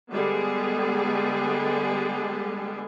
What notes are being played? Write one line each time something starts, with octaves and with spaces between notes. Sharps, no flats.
D3 G3 G#3 B3 G4 G#4